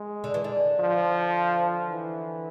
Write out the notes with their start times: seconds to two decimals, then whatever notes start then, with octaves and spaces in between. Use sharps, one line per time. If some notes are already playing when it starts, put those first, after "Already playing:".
Already playing: G#3
0.24 D3
0.34 E3
0.44 D3
0.79 F3
1.89 E3